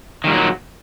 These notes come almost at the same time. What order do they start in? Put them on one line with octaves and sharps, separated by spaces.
D#3 G3 A#2 F#3